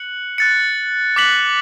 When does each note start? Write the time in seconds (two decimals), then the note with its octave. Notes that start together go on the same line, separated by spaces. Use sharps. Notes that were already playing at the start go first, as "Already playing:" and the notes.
Already playing: F#6 C#7 F#7
0.38 F#6 A6 C#7
1.16 D6 F#6 B6 F#7